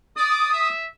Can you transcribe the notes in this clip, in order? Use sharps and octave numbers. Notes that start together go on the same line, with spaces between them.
D5 D#6
E5